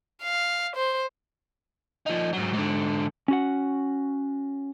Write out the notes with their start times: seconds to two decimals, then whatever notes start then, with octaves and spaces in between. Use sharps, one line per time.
0.23 F5
0.76 C5
2.06 F3 D#4
2.33 G#2 F#3
2.54 G#2 D3
3.28 C#4 F#4 F#5